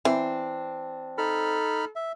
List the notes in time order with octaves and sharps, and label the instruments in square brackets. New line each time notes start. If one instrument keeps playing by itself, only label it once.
[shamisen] E3 [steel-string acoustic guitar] C4 D4
[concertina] D#4 B5 F6 [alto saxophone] A4
[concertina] E5